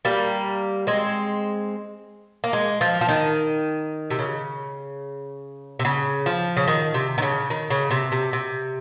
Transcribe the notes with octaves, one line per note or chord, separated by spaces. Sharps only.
G3 A#3
G#3 C4
A#3
G#3
F3
F3
D#3
C3
C#3
C3
C#3
F3
C#3
D#3
C3
D#3
C#3
D#3
C#3
C3
C3
C3